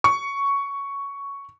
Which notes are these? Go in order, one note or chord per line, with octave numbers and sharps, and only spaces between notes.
C#6